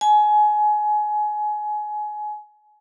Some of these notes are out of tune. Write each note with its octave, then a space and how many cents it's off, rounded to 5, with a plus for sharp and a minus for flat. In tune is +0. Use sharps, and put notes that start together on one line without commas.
G#5 +25